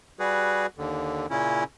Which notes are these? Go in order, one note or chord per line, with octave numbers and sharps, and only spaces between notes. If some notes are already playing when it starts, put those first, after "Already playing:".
G3 F#4 G#4 B4
D#2 D3
A#2 C#3 C#4 E4